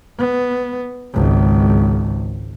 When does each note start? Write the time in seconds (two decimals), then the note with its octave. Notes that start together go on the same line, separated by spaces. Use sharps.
0.19 B3
1.14 G#1 C#2